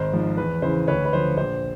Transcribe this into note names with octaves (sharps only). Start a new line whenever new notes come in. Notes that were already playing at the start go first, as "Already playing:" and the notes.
Already playing: G#1 C5
G#2 F3
E2 B4
C#3 E3 C5
D2 B4 C#5
B4
D3 F3 C5
A#1 C5